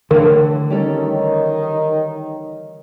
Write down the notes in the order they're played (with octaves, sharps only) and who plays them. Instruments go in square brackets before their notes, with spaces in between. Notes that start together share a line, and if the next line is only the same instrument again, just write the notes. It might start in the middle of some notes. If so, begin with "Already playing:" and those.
[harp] A2 E3 [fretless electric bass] D3 [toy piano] A#4
[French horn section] D#3 D#4 [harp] G3 C#4 A4